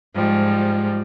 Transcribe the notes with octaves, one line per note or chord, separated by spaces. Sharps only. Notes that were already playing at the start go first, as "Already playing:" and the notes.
G#2 F3 G3